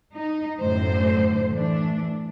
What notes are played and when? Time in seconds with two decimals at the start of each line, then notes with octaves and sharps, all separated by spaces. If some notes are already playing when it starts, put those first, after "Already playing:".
0.16 D#4
0.60 F#2 A2 D3 C5
1.51 E3 A3 D4